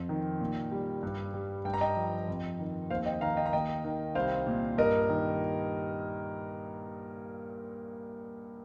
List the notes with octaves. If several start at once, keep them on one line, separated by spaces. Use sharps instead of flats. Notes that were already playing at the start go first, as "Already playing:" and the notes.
Already playing: F2
D#3
A#2
G3
G2
G3
G2 G5
A#5
D#5 G5
F3
F2
D#3
D#2 C5 F5
D#5 G5
D#3 F5 A#5
D#5 G5
A#5
D#2 D#5 G5
D#3
C2 C5 F5
A#2
G2 A#4 D#5
D#3